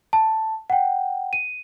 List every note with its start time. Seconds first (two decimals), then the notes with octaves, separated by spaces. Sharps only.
0.13 A5
0.70 F#5 G5
1.33 D#7